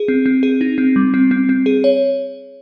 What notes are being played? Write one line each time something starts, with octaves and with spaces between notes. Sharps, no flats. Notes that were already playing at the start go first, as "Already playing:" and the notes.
Already playing: G#4
C4
C4
G#4
D#4
C4
G3
C4
C4
C4
G#4
C#5